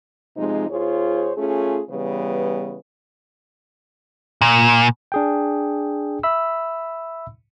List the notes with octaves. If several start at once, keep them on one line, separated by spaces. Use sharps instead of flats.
C3 F3 G#3 C4 D#4
D#2 F4 G#4 C5 C#5
A3 C#4 F4 G#4
C#3 E3 G3 B3 B4
A#2
D4 G#4 G5
E5 B5 E6